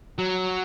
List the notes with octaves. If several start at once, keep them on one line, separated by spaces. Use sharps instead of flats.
F#3